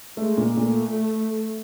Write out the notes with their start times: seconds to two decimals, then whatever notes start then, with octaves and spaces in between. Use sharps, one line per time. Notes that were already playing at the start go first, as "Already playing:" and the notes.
0.17 G#3 A3
0.37 A#2
0.57 A#2 A3